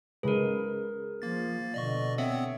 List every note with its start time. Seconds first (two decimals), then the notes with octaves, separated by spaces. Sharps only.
0.23 C#3 G#3 G#4 A#4 B4
1.22 F3 A#3 A6
1.74 B2 D3 D5 D#5 C#6
2.18 B3 C4 C#5 E5 F#5